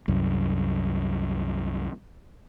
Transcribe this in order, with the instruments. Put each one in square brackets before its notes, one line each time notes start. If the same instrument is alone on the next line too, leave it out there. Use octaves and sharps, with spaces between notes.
[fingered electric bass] C2 F#2